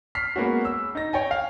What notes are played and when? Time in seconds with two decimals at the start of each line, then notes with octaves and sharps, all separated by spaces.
0.15 F6 B6 C7
0.36 G#3 A#3 B3 C#4 F#4
0.65 E6
0.95 D#4 A#6
1.13 C#5 G5 G#5
1.31 F5